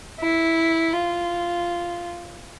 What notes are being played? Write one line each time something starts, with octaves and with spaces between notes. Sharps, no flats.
E4
F4